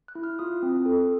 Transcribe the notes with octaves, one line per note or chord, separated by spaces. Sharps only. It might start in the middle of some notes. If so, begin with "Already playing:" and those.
F#6
E4
F6
F4 D#6
C4
A4